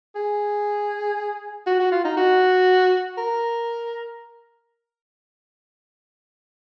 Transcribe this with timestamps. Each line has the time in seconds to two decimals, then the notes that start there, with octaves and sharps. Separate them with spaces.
0.16 G#4
1.67 F#4
1.79 F#4
1.92 F4
2.04 D#4
2.17 F#4
3.18 A#4